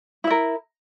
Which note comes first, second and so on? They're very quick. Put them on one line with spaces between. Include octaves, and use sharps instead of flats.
E4 E5 A#4